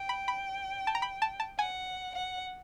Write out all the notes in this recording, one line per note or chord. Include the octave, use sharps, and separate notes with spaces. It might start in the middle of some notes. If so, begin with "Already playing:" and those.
Already playing: G5
B5
B5
A5
A#5
B5
A5
A5
F#5 G#5
F#5